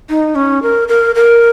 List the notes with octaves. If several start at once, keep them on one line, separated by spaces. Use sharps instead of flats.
D#4
C#4
A#4
A#4
A#4